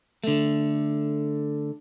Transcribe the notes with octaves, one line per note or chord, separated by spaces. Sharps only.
D3 A3